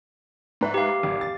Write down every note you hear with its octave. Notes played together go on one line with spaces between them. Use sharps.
G#2 B4 E5
G4 F5
G#1
A6